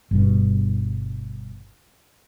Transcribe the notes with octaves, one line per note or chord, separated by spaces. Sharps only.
G1 G2 B2